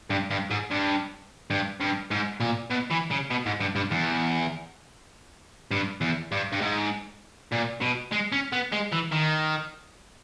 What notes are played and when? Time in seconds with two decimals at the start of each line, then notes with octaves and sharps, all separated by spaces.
0.10 G2
0.30 G2
0.50 G#2
0.71 G2
1.50 G2
1.81 G2
2.11 G#2
2.40 A#2
2.70 B2
2.90 E3
3.11 C#3
3.30 B2
3.46 G#2
3.60 G2
3.76 G2
3.91 E2
5.71 G2
6.01 E2
6.32 G2
6.53 G2
6.61 G#2
7.52 A#2
7.82 B2
8.12 G#3
8.32 C#4
8.52 B3
8.72 G#3
8.92 E3
9.12 D#3